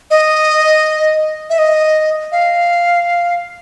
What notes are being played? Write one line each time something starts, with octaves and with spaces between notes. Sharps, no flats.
D#5
E5
D#5
F5